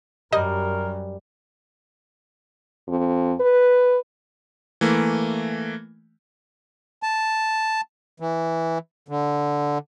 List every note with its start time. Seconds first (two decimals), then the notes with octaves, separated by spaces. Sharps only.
0.32 F#2 G3 A#4 D#5
2.88 F2
3.40 B4
4.81 E3 A3 A#3
7.03 A5
8.20 E3
9.08 D3